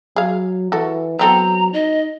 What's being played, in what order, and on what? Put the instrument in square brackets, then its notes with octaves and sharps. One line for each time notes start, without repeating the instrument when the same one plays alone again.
[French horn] F#3 [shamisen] G#4 F5
[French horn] E3 [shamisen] F#4 A4
[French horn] F#3 [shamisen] B3 C4 A4 [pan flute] A#5
[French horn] D#4 [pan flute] D#5